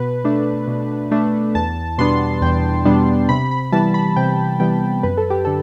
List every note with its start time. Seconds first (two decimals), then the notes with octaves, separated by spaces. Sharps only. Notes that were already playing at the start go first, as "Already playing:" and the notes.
Already playing: B2 B4
0.24 A3 D4
0.68 B2
1.11 A3 D4
1.55 E2 A5
1.98 B2 G3 B3 D4 C6
2.42 E2 G5
2.85 B2 G3 B3 D4
3.29 C3 B5
3.51 B5
3.72 E3 G3 B3 A5
3.94 B5
4.16 C3 G5
4.60 E3 G3 B3 G5
5.03 F#2 B4
5.17 A4
5.30 G4
5.45 D3 A4